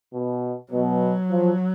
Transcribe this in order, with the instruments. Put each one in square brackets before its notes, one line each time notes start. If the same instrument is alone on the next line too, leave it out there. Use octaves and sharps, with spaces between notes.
[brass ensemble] B2
[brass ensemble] B2 [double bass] F#3
[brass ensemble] F3